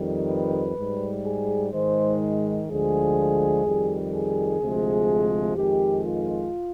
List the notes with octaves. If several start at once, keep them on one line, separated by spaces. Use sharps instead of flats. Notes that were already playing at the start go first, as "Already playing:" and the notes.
Already playing: F2 D#3 G3
B4
G#2 G3
G#4
G#2 D#3 G#3 C5
D2 D3 F3 G#3 G#4
F2 D#3 G3
G#4
D2 C3 F3 G#3
F2 D#3 G#3 G4
F4